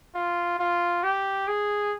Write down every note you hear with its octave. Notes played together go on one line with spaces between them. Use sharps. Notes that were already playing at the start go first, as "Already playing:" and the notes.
F4
F4
G4
G#4